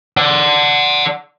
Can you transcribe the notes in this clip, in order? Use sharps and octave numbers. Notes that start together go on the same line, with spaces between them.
D5 F#5